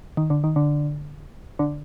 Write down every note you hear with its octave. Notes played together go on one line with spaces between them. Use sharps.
D#3
D3
D#3
D3
D3